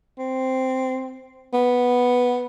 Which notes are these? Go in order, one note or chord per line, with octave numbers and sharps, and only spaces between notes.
C4
B3